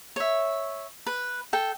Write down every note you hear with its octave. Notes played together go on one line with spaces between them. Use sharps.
C#5 E5
B4
A4 G5